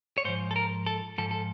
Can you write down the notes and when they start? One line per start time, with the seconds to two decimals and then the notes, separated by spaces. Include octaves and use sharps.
0.18 C#5
0.25 G#2 F3 C5
0.51 A4
0.56 A#4
0.86 A4
1.18 G#2 F3 A4
1.31 A4